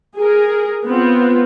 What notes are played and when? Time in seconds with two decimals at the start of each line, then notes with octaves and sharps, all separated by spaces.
0.16 G#4 A#4
0.84 B3 C4 F4